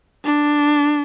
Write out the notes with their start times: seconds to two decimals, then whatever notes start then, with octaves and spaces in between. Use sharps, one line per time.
0.25 D4